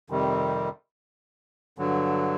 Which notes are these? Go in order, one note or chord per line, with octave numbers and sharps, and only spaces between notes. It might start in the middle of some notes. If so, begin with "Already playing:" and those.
F2 C3 D#3 G3
G2 D3 F#3